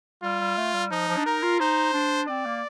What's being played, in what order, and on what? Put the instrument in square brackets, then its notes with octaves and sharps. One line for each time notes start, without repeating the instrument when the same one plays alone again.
[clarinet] G3 [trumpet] F4
[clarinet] G3
A3
G3
[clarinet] F3 [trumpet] D#4
[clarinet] F3
D4
[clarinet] D#4 [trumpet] A#4
[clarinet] F4
[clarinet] D#4 [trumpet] C5
[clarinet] D4
[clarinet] C4 [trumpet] D5
[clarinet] A#3